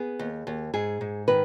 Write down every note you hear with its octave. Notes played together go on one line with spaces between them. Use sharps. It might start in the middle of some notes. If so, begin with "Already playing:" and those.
Already playing: B3 G#4
D#2
D#2
G#2 G#4
G#2
D#3 B4